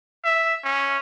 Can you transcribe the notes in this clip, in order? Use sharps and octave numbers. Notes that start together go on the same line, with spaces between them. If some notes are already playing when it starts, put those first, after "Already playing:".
E5
C#4